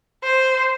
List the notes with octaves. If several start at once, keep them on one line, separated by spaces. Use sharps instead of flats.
C5